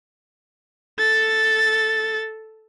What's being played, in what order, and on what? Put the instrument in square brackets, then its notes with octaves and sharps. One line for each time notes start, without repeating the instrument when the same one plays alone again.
[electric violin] A4 A6